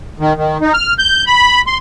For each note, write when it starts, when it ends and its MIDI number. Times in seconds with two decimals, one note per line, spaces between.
0.20 0.33 51
0.37 0.58 51
0.61 0.73 63
0.74 0.94 89
0.99 1.24 91
1.27 1.61 83
1.67 1.78 84